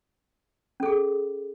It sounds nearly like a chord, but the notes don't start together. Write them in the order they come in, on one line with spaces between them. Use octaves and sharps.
C#4 A4 G#4